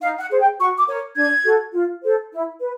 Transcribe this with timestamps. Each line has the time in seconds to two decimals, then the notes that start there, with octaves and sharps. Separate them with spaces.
0.01 D#4 F5
0.20 F#5
0.31 G#4 C5
0.40 G5
0.59 F#4 C#6
0.78 D6
0.88 A#4 C#5
1.16 D4 G#6
1.45 F#4 A4
1.73 F4
2.02 A4 C5
2.31 E4
2.60 B4